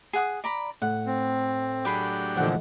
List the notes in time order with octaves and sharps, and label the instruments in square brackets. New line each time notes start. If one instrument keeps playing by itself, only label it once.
[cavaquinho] G#4 F#5 D#6
D5 A#5 B5
[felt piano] A2 [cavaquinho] F#5
[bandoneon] C4
[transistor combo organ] F#3 D4 G4 [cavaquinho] G#4 B5 D6
[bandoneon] A#2 D3 F3 [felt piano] E3 A3 D#5 [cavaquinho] F#5